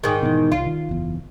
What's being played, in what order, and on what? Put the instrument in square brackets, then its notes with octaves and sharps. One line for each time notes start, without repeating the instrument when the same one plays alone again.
[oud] G#2 D#3
[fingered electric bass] B2 D3 E3
[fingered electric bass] C2 [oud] F4
[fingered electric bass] D#3
F#1 E2